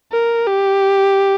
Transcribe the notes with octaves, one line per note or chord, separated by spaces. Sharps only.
A#4
G4